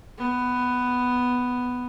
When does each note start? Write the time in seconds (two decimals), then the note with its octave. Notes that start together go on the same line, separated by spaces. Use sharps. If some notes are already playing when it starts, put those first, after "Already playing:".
0.18 B3